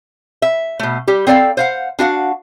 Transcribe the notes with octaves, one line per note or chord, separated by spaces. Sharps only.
E5
B2 A3
G3 G4
C4 A4 D5 F5 G5
C5 F5 F#5
D4 F#4 F5 F#5